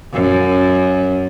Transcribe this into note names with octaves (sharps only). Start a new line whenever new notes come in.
F#2